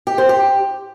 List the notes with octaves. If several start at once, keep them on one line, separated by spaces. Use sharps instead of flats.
G4
C5
G4